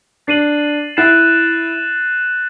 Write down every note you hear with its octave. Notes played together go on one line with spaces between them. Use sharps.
D4 A6 C7 D#7 F#7
E4 F#6 A6 C7 E7